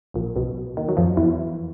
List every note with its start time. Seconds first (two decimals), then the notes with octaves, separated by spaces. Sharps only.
0.14 A#1 A#2
0.36 B1 B2
0.77 D#2 D#3
0.89 F#3
0.97 F2 F3
1.17 E2 E3